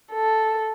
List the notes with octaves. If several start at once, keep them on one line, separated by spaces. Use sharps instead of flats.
A4